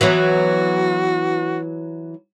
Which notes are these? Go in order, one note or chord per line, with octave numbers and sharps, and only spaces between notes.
E3 F#3 B3 F#4